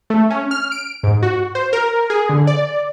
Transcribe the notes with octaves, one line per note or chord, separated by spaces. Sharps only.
A3
C#4
F6
D7
G#2
F#4
C5
A#4
G#4
D3
D5